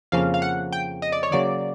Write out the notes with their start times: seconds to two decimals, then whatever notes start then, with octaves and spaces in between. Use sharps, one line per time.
0.12 F2 C#3 F3 A#3 C#4 F5
0.34 F5
0.42 F#5
0.73 G5
1.02 D#5
1.12 D5
1.23 C#5
1.32 C#3 F#3 A#3 D5